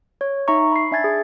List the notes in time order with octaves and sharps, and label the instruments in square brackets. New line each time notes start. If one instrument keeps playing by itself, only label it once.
[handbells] C#5
D#4 E5 A#5 C#6
B5 C7
D4 E5 G#5 G#6 A6
G#4